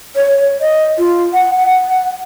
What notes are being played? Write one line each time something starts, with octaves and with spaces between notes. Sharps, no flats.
C#5
D#5
F4
F#5
F#5